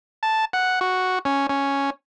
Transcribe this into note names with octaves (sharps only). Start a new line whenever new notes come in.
A5
F#5
F#4
C#4
C#4